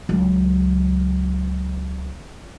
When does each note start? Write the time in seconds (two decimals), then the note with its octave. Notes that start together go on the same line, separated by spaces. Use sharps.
0.09 C#2 F#3